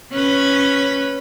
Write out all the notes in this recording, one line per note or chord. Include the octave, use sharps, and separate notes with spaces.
C#4 B4